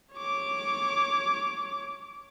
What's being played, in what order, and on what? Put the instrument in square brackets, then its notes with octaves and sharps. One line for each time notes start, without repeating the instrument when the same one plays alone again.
[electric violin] C#5 D6